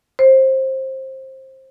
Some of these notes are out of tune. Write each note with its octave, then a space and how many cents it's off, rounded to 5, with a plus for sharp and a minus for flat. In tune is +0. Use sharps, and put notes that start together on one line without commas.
C5 +20